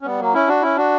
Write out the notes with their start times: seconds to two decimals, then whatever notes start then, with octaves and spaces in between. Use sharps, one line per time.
0.02 C#4
0.05 G3 B3
0.19 F#3 A#3
0.34 C#4 E4
0.48 D4 F#4
0.62 C#4 E4
0.77 D4 F#4